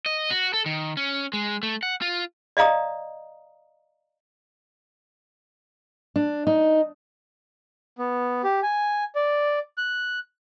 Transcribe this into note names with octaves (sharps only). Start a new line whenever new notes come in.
D#5
F#4
A4
D#3
C#4
G#3
A3
F#5
F4
D5 D#5 F5 A#5 D#6
D4
D#4
B3
G4
G#5
D5
F#6